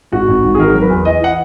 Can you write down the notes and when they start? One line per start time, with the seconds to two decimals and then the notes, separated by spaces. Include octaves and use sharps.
0.12 G#1 F#4
0.28 G#1
0.44 G#1
0.54 G#4
0.58 D#3 A#4
0.74 F#3 A#4
0.82 B4
0.90 E2
1.05 E3 D#5
1.21 E3 F#5